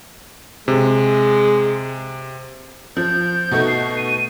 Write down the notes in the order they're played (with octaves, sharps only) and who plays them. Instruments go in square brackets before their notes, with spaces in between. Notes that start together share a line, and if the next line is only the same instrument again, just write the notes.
[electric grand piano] C3 [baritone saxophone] G#3
[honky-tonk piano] F3 [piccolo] G6
[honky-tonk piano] B2 A3 D#4
[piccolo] C7
D#7